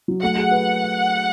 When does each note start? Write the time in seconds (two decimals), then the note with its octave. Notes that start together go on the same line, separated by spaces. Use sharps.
0.08 F#3
0.22 A3 F#5
0.38 G#4
0.51 B4